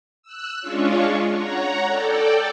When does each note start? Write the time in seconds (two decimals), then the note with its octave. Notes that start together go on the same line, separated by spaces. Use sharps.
0.23 E6 F#6
0.61 G#3 C#4 D4 F4 C#5
1.33 C#5 F#5 A#5
1.87 A4 D5 G5